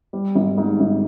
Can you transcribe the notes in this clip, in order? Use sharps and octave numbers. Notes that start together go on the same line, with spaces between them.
G3
G#1
G#2
G#1